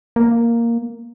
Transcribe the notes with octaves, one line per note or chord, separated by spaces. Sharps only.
A#3